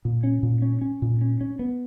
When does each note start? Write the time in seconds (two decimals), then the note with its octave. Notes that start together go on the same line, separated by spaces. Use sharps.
0.05 A#2
0.24 C#4
0.43 A#2
0.62 C#4
0.81 C#4
1.02 A#2
1.21 C#4
1.41 C#4
1.59 B3